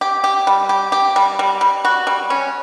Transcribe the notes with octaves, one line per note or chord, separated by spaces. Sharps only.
G4
G4
G3
G4
G4
G3
G3
G3
F#4
G3
C#4